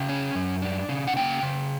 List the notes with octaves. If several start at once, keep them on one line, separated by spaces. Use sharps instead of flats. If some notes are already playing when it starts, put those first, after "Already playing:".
Already playing: C#3 G5
C#4
F#2
D4
C#3
F#5
A#3 G5
C#3